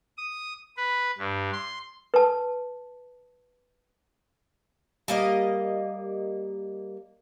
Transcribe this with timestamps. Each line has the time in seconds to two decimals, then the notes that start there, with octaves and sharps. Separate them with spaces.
0.18 D#6
0.77 B4
1.18 G2
1.53 C6
2.14 B4 A5
5.08 G3 A#3 D#5